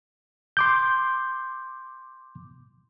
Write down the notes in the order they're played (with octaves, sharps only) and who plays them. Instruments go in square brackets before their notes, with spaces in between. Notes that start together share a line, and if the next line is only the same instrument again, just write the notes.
[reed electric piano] C6 D6 G6